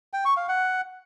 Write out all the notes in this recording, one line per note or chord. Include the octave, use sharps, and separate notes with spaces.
G5
C#6
F5
F#5